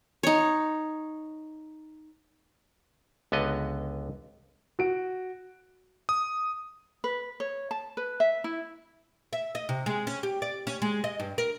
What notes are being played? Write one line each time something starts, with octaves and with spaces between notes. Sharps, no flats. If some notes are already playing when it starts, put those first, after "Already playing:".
D#4 C#5
C#2 D3 B3 D#5
F#4 D7
D#6
B4
C#5
A5
B4
E5
E4
E5
D#5
C3
G#3
C#4
G4
D5
C#4
G#3
D#5
G2
A#4